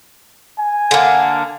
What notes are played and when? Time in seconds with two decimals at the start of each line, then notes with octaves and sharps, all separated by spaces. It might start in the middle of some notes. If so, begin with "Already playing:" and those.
0.59 G#5
0.91 D3 A#3